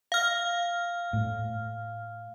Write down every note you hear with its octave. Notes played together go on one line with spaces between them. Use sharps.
F5 F6
A2